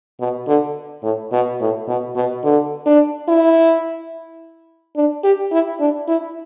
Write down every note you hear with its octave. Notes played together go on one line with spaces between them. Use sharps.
B2
D3
A2
B2
A2
B2
B2
D3
D4
E4
D4
G4
E4
D4
E4